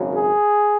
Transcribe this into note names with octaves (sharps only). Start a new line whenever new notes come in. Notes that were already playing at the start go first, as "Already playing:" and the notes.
Already playing: G#1 F#2 C#3 F#3
G#4